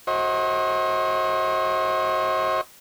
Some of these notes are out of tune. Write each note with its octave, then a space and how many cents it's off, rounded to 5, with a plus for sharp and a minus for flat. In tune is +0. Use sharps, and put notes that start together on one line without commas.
F#4 +0 C5 +35 D#5 +35